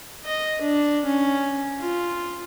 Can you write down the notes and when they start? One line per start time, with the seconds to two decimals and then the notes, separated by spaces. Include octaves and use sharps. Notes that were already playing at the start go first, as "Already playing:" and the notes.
0.25 D#5
0.62 D4
1.05 C#4
1.80 F4